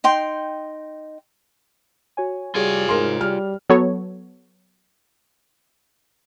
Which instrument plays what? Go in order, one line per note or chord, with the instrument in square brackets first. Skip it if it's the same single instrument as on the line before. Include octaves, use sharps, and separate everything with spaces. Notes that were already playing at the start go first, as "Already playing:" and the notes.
[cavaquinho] D#4 G5 C6
[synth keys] F#4 C#5 G#5
[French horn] G3 [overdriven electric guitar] F4 G#5 [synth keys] F#4 G#4 C#5
[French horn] G#2 [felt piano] A#4 C6
[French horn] G3 [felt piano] F6
[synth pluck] F#3 B3 F#4 A4 C#5